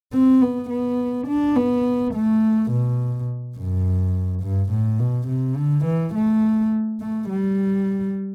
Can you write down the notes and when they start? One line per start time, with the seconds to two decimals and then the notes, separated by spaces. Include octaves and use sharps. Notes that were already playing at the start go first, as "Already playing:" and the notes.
0.13 C4
0.41 B3
0.70 B3
1.27 D4
1.56 B3
2.14 A3
2.72 B2
3.57 F#2
4.43 G2
4.71 A2
4.99 B2
5.28 C3
5.56 D3
5.85 E3
6.14 A3
7.00 A3
7.29 G3